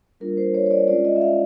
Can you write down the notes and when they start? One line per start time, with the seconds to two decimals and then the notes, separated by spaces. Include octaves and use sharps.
0.20 G3 A#3 D4 F4 A#4
0.37 C5
0.54 C#5
0.66 C#5
0.71 D5
0.88 G#3 C#4 F4 D5
1.05 D#5
1.16 E5
1.21 F5